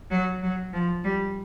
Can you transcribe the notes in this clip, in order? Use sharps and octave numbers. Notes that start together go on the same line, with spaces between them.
F#3
F#3
F3
G3